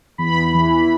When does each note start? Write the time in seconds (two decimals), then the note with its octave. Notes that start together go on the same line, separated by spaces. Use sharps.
0.18 E2 B5
0.54 E3